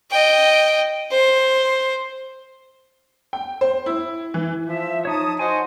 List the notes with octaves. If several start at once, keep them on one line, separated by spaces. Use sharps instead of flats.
D#5 G5
C5
G5
C5
E4
E3
F3 E5
D#4 C#5 A5 D#6
F#4 C5 D#5 G#5